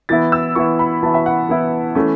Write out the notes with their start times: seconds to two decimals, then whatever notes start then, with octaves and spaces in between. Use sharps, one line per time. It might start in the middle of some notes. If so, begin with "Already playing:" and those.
0.09 E3 B3 E4 A6
0.32 E6
0.55 E3 B3 E4 C#6
0.79 B5
1.03 E3 B3 E4 A5
1.14 E5
1.26 F#5
1.49 E3 B3 E4
1.95 E3 A3 C#4